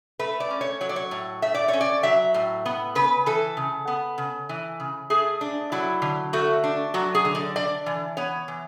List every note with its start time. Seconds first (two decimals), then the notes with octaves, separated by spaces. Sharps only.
0.19 A3 B4
0.40 D5
0.50 C#4
0.61 C#5
0.81 F#3 C#5
0.89 D5
0.96 C#5
1.11 A2
1.42 A3 E5
1.54 D5
1.68 C#4 C#5
1.81 D5
2.03 F#3 E5
2.34 A2
2.65 B3
2.95 C#3 B4
3.26 E3 A4
3.57 C#3
3.87 B3
4.18 C#3
4.49 E3
4.80 C#3
5.10 A3 G#4
5.41 D4
5.72 F#3 E4
6.02 D3
6.33 A3 F#4
6.64 D4
6.94 F#3 F#4
7.15 G#4
7.25 D3
7.35 D5
7.56 D4 D5
7.86 E3
8.17 B3 C#5
8.48 E3